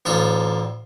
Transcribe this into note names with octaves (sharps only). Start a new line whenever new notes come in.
A1 D2 F4 A4